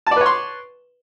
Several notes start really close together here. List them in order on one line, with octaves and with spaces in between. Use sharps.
A5 D5 B4 C#5 C6